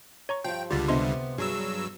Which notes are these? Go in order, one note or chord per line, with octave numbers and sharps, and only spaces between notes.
C#5 A#5 C#6
G2 F3 G5
C#2 D3 G3 F4 A6
C3 B3 D4 D#5 C6
G2 F#3 G#4 E6